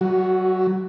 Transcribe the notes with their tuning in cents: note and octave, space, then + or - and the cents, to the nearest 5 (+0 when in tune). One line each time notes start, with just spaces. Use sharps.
F#3 +30 F#4 +0